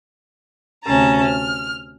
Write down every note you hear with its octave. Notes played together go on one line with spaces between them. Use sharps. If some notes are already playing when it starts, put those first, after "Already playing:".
D2 C3 C#4 A5 A#5
F6